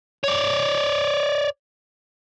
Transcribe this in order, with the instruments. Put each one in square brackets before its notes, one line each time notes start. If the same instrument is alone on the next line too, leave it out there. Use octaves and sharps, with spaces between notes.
[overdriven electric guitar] C#5 D5